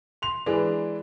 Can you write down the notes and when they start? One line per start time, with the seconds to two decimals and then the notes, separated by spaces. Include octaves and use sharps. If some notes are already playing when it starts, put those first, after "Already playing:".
0.22 C6 F7
0.46 E3 G#3 D4 G#4 B4